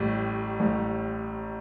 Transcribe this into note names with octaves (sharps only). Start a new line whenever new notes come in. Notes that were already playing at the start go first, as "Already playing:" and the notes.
Already playing: A1 A2 G3
A1 A2 G3